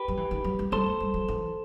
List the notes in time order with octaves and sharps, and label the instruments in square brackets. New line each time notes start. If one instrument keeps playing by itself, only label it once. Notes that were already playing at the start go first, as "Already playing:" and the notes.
Already playing: [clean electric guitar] G4 B4
[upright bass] F#3
E3
D#3
F#3
G3
[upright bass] G3 [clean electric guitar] A4 C5
[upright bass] A3
G3
F#3
E3